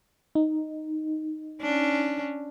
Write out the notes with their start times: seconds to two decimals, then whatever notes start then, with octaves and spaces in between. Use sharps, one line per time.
0.35 D#4
1.61 C#4 D4